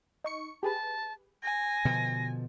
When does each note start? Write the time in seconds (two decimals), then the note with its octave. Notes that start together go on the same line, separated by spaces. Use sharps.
0.24 D#4 C#6 C#7
0.63 G4 G#4 B4 A5
1.43 G#5 A#6
1.85 B2 D3 F3